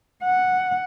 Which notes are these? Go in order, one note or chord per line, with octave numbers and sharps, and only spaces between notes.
F#5